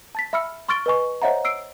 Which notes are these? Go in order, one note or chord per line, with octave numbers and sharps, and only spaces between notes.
A5 A6 B6
E5 B5 E6 F6 C#7
C6 C#6 F6 A6 D7 G7
B4 D#5 G#5 C#6
C5 C#5 D#5 E5 F#5 A#5
E6 C7 D7